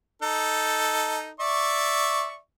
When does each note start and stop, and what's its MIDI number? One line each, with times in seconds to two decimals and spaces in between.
0.22 1.30 63
0.22 1.30 69
1.40 2.38 74
1.40 2.38 76
1.40 2.38 85